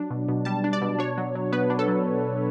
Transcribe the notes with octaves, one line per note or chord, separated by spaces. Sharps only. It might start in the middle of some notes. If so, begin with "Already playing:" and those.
Already playing: F#3 D4
B2
B2
G3 A5
D4
D5
B2
D4 C#5
F#3
F#3
B3 B4
D4
A4
F#3